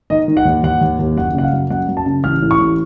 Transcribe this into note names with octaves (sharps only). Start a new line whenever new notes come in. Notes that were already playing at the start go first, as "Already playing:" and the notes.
D#3 D#5
D#3
F#5
D#2
D#2 F#5
D#2
D#2
F#1 F#5
C#3 F#5
F5
F#2
F#2 F#5
F#2
A5
C#3
A1 F6
A2
C#6
A1